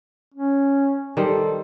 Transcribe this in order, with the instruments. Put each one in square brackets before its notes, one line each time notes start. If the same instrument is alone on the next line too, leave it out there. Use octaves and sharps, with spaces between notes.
[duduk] C#4
[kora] D#3 G3 C5 [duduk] A4